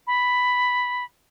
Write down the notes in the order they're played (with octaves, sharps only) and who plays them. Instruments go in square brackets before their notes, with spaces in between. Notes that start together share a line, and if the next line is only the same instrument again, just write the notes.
[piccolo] B5